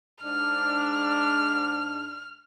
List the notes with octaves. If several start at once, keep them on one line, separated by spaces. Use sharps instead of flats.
G#2 D4 F6